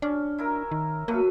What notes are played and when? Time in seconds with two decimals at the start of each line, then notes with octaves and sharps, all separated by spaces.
0.02 C#4 D4
0.38 E4 A#4
0.71 D#3
1.08 F#2 A3 A#3 B4